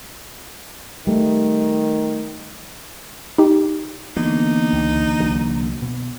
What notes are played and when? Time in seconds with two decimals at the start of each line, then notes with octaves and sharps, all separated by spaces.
1.07 D#3 G3 A3
3.38 D#4 G4
4.16 D3 E3 A#3 B3 D#4
4.73 C#2
5.20 C2 F#3
5.82 B2